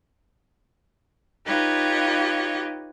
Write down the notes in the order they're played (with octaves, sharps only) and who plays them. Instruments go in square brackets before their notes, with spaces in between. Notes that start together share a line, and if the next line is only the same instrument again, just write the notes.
[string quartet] D#4 F4 G4 B4 C#5 D#5